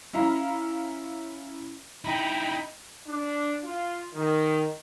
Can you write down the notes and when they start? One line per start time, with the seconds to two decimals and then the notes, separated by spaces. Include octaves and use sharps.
0.13 C#4 E4 F5 A#5 B5
2.04 D#4 E4 G5 A#5 B5
3.07 D4
3.64 F4
4.14 D#3